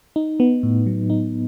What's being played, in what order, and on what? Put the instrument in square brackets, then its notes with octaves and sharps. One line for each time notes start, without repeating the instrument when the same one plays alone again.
[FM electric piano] D#4
B3
A2
F#3
D#4